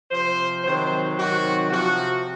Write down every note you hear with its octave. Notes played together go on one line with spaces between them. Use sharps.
C3 F3 C5
C3 D#3 F#3 C5
C3 D#3 F#3 F#4
C3 F3 F#4